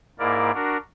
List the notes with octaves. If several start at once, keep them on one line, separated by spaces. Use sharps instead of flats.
G#2 A#3 E4 A#4 D5
D4 F#4 A#4